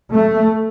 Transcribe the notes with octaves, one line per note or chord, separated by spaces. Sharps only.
A3